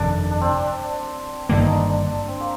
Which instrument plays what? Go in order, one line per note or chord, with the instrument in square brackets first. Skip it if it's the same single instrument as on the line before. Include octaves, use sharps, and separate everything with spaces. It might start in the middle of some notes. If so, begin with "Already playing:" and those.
Already playing: [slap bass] G1 F2 C3 D#3 [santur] D4
[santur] D4
C4
D4
[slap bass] G1 G2 D#3 A#3 [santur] D4
[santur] D#4
D4
D4
C4
A#3